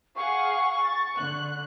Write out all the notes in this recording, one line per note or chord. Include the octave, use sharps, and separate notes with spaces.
G#4 F5 F#5 C#6
A6
D3 F#6